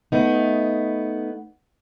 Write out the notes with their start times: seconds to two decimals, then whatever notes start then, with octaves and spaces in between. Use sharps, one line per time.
0.12 A3 B3 D#4